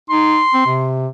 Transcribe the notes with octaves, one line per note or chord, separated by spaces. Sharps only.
D#4 C6
C4
C3